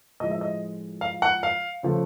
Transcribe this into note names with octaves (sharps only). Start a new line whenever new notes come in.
A2 F3 G#3 D#5
E5
D#5
F5
F#5
F5
C#3 F3 A3